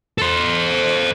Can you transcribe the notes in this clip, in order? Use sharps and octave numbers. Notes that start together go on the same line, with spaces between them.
A4 C5